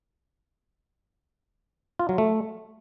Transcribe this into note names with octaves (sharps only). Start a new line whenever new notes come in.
F4
F#3
A3